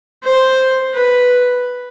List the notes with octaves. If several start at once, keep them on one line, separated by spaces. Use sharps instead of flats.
C5
B4